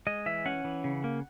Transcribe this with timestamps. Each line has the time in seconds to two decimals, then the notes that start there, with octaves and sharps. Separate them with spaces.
0.07 G#3 D#5
0.26 E3 E5
0.46 C#4 F#5
0.64 E3
0.84 C#3
1.04 A#3